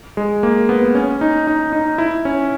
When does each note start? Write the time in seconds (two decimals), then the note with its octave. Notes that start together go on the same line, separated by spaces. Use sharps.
0.17 G#3
0.43 A#3
0.69 B3
0.95 C#4
1.21 D#4
1.47 D#4
1.73 D#4
1.98 E4
2.25 C#4